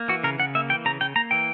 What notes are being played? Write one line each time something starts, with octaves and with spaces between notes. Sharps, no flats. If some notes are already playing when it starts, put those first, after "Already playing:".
Already playing: A#3
E3 F#4
C#3 A#4
C#3 F#5
A#3 E5
E3 G5
C#3 A#5
C#3 G5
A#3 A#5
E3 G5